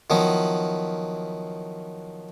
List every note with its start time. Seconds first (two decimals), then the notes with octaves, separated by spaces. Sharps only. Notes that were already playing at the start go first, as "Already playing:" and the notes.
0.10 D#3 F3 F#3 B3 E4